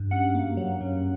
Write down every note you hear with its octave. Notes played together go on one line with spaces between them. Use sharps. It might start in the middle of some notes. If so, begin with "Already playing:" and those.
Already playing: G2
F#2 F#5
A#3
F#3
F#2